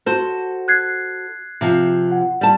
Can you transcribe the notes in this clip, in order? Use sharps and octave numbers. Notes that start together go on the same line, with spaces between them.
F#4 A4 C5
F#6 G#6 C7
C3 F3
F#5
G3 A5